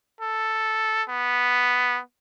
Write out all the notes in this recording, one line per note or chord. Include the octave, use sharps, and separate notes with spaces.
A4
B3